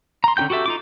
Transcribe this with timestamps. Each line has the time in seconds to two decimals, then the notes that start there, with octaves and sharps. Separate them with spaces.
0.24 A#5 C6
0.37 D3 C#4 G4 G5 G6
0.50 F#4 G4 A4 E5
0.66 D#4 F4 D6